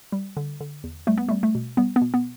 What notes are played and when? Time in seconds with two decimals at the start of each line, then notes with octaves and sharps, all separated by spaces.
0.12 G3
0.37 D3
0.60 D3
0.84 E2
1.07 G3 A3
1.18 B3
1.29 G3 A3
1.43 A3
1.55 B2
1.77 G3 B3
1.96 B3
2.01 B2
2.14 B3